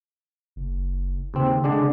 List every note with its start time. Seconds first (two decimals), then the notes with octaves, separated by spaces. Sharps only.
0.56 F#1
1.34 D#2 C#3 C4
1.64 D3 G#3 D4